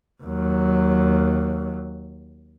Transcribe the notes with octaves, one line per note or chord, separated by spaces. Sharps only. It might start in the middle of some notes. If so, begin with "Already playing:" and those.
D#2 F#3